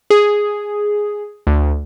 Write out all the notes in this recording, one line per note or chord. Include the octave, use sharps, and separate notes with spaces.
G#4
D2